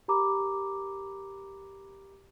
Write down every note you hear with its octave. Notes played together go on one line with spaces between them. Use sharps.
G4 A#4 A#5 B5 D6